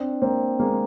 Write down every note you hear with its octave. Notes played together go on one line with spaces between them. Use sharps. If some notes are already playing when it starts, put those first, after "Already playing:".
Already playing: C4 D4
A#3 C4
G#3 A#3